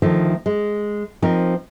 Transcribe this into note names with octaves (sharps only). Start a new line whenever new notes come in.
D2 D#3 F3 A3
G#3
F3 C4 D#4 A#4